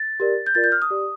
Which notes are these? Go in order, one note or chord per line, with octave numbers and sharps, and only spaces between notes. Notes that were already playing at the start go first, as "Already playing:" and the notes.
Already playing: A6
G4 A#4 D5
G6
F4 A#4 D5 A6
G6
F6
D#6
G4 D5